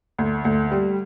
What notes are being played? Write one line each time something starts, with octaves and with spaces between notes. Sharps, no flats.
D2
D2
G3